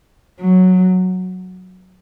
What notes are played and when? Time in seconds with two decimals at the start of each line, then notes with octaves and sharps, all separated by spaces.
0.40 F#3